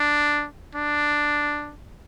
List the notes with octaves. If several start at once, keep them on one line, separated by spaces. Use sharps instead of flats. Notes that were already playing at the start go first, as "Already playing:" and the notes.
Already playing: D4
D4